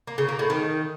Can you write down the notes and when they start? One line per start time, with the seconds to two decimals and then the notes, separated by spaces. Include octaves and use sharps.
0.07 A#3
0.18 C#3
0.29 A#3
0.39 A2
0.50 D#3